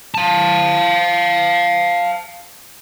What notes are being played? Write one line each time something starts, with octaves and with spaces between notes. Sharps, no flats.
F5 A5